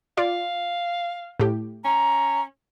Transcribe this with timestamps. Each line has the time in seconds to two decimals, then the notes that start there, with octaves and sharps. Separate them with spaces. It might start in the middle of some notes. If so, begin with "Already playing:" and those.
0.17 F4 D5 F5
1.40 A2 G4
1.85 C#4 A#5